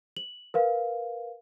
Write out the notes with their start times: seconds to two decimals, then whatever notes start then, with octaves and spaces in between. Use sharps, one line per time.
0.17 F#7
0.54 A#4 B4 F5